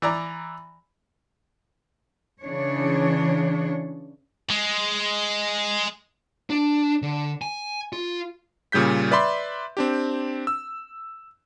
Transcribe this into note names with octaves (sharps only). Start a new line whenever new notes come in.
E3 D5 A#5
C#3 E3 D4 C#5
G#3
D4
D3
G#5
F4
A#2 C#3 G3 G6 B6
B4 D5 E5 B5 C6
C4 D4 G4
E6